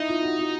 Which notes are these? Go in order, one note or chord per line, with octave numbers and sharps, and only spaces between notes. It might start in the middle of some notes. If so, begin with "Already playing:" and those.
Already playing: D#4 E4
F4
F#4
F#4